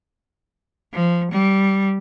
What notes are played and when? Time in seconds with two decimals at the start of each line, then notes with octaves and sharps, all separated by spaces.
0.93 F3
1.31 G3